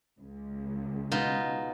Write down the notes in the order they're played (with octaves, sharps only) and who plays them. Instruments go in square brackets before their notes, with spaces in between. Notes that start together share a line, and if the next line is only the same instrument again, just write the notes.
[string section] C#2
[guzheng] B2 D#4 F4